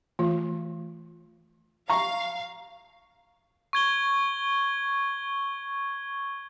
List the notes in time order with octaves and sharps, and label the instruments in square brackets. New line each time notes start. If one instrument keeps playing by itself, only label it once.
[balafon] E3 A3 F4
[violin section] F5 [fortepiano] A#5 C#6
[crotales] C#6 G#6 G7